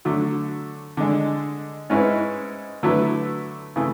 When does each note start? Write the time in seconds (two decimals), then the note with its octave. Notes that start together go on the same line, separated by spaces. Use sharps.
0.05 D3 F#3 A3
0.97 D3 G#3 D4
1.90 G#2 G#3 C#4 E4 B4
2.83 D3 F#3 A3 E4 B4
3.76 C#3 E3 A3